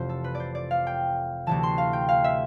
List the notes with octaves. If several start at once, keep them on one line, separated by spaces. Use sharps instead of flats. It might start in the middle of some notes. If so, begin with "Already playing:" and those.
Already playing: F1 F2 C3 E3 C5
A4
B4
D5
C5
D5
F5
G5
D2 C3 E3 A5
C6
F5
G5
F5
E5